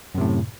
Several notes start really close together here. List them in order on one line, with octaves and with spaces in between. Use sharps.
F#2 C3 A2